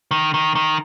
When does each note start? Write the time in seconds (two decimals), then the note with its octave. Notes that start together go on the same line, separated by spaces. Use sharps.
0.11 D#3
0.34 D#3
0.55 D#3